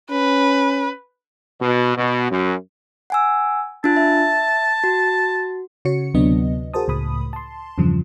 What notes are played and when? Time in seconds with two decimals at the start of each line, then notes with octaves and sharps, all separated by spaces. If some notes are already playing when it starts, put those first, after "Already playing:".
0.11 C#4 B4
1.60 B2
1.97 B2
2.30 F#2
3.10 F#5 G#5 E6
3.84 D4 F4 A5
3.97 E5
4.84 F#4
5.85 C#3 F#4 C#5 C#7
6.14 D2 C3 F#3 B3 D4 D#5
6.74 F#4 G#4 A#4 C5 A5 D#6
6.88 C#2 A2 B5 D#6
7.33 A5 C6
7.78 E2 G2 C#3 F3